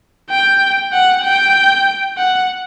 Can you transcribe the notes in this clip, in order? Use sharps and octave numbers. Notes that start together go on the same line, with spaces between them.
G5
F#5
G5
F#5